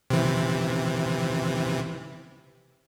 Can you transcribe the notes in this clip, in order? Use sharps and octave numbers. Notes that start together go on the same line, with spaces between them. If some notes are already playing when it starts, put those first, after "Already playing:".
C3 E3